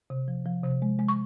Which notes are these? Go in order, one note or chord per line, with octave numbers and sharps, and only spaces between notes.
C3
F3
F3
C3
G#3
G#3
C#6